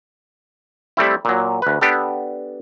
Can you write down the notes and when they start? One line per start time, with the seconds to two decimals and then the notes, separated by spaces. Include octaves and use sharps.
0.97 G3 A3 C4 E4
1.25 A#2 F#3
1.62 D2 B4
1.81 B3 D4 G4 A4